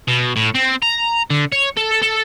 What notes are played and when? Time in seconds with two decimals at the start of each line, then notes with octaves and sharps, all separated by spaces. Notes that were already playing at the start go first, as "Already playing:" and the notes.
0.08 B2
0.36 A2
0.55 C4
0.82 A#5
1.30 D3
1.52 C#5
1.77 A4
2.02 A4